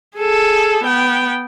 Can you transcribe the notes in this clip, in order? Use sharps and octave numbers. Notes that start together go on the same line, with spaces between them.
G#4 A4
B3 G5